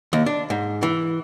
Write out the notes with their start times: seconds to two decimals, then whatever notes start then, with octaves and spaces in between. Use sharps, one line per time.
0.13 D#2
0.26 D4
0.50 G#2
0.83 E3